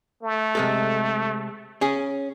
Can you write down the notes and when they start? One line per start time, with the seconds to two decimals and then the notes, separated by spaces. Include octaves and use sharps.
0.23 A3
0.55 C3 G#3 A4
1.81 C#4 G#4